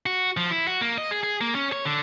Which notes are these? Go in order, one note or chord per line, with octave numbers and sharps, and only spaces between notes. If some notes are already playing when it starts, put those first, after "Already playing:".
F#4
F3
E4
F#4
A#3
D#5
G#4
G#4
A#3
C#4
C#5
D3